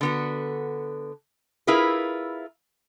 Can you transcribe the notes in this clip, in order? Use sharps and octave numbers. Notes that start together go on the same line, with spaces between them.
D3 B3 F#4
E4 F4 G#4 A#4 B4